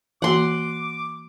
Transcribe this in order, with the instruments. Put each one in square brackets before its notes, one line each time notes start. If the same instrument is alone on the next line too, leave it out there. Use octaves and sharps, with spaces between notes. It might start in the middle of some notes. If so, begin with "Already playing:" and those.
[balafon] E3 A#3 F#4 [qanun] F#5 C6 [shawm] D6